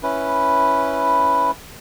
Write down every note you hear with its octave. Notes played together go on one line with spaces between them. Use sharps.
C#4 E4 B4